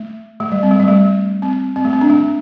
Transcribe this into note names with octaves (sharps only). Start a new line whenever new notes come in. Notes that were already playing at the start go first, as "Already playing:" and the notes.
Already playing: A3
A3
G3
C4
A3
G3
A3
C4
C4
A3
C4
D4
A3